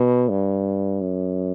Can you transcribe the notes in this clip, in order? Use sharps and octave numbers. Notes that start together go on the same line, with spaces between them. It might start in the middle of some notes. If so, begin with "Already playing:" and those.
Already playing: B2
G2
F#2